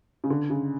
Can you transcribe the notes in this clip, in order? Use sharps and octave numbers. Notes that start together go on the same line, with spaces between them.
C#3
D3
C#3